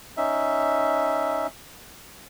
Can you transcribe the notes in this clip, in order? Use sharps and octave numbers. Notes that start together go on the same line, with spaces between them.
C#4 D#4 E5